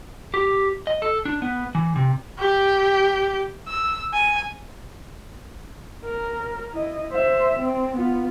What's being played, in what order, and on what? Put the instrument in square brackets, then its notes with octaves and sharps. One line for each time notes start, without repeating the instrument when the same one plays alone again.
[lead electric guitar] G4
D#5
A4
D4
B3
E3
C3
[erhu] G4
E6
G#5
[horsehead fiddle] A#4
E4 D#5
C5 E5
C4
B3 F4